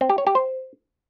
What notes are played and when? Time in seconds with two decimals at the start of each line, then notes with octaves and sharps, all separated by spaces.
0.01 C4
0.09 G4
0.18 C#5
0.27 G4
0.35 C5